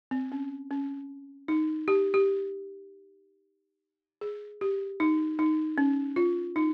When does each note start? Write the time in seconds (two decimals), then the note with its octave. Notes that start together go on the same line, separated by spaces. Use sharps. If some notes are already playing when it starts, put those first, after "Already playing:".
0.11 C4
0.32 C#4
0.71 C#4
1.48 D#4
1.88 G4
2.14 G4
4.21 G#4
4.61 G4
5.00 D#4
5.39 D#4
5.78 C#4
6.16 F4
6.56 D#4